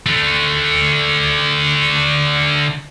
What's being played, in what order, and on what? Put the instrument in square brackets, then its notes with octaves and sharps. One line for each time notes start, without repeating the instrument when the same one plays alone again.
[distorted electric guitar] D3 A3